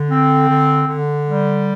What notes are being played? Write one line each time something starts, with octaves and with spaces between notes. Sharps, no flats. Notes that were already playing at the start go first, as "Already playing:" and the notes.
Already playing: D3
C4
D3
D3
G3